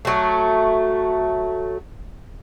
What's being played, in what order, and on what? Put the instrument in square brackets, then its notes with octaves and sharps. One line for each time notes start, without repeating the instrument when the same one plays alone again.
[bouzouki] F#3 A3